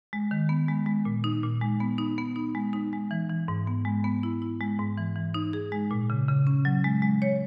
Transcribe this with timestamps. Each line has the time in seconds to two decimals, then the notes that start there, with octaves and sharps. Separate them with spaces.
0.13 G#3
0.31 D#3
0.49 B3
0.68 G#3
0.86 G#3
1.05 A#2
1.24 D#4
1.43 A#2
1.61 G#3
1.80 B3
1.98 D#4
2.18 B3
2.36 D#4
2.55 G#3
2.73 D#4
2.93 G#3
3.11 E3
3.30 E3
3.48 G#2
3.67 B3
3.85 G#3
4.04 B3
4.23 E4
4.42 E4
4.61 G#3
4.79 G#2
4.98 E3
5.16 E3
5.34 D#4
5.53 G#4
5.72 G#3
5.91 A#2
6.10 C#3
6.28 C#3
6.47 C#4
6.65 F#3
6.84 G#3
7.02 G#3
7.22 C#5